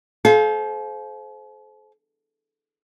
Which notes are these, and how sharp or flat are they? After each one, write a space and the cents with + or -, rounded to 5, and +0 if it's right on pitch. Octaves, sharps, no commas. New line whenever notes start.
A4 -45 C5 +0 F5 +0